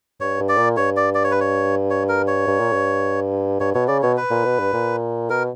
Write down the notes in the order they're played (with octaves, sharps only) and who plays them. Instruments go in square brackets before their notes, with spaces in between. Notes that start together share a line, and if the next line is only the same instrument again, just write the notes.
[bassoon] G2 [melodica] C#5
[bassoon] G2
[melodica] D5
[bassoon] A#2
[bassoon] G2 [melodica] C#5
[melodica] D5
D5
C#5
B4
C#5
C#5
A#4
C#5
[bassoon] G2
A#2
G2
[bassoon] G2 [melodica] C#5
[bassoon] B2 [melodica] C#5
[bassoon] C#3 [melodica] D5
[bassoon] B2 [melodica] C#5
[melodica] B4
[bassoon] A#2
B2
G2
A#2
[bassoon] B2 [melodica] A#4